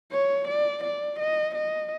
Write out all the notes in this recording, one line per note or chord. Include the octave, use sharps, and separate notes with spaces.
C#5
D5
D5
D#5
D#5